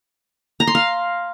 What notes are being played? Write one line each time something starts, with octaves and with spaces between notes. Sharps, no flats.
A#5
C6
F5